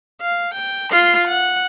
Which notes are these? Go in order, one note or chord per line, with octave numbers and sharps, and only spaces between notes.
F5
G5
F4 C6
F#5